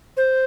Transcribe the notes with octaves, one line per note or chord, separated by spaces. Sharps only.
C5